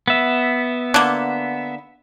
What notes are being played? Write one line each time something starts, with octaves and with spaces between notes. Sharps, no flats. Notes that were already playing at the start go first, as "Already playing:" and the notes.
B3 E5
D3 A#3